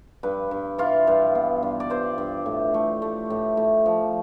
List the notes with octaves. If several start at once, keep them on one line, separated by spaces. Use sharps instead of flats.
G2 B4
G2
E3 F4
G2
B3
G2
D5
G2 C5
G2
A2
A3
A3
A2
A2
F3